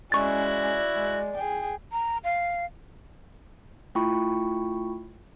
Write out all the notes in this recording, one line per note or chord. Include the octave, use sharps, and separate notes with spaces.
G#3 C#4 E4 F#4 D5 C#6 A6
G#3
G#4 G5
A#5
F5
A3 E4 F4 G5 B5 C#6